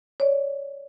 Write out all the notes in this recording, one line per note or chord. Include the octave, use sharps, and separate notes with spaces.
C#5 D5